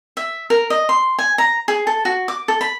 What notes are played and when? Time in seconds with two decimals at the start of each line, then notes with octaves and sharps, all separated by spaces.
0.17 E5
0.50 A#4
0.70 D#5
0.89 C6
1.19 G#5
1.38 A#5
1.68 G#4
1.87 A4
2.05 F#4
2.28 D6
2.48 A4
2.61 B5